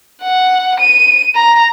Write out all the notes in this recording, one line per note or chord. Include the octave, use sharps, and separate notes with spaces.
F#5
D#7
A#5